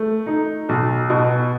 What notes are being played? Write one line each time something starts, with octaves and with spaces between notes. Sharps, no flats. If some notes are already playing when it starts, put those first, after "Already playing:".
Already playing: A3
D#4
B1
B2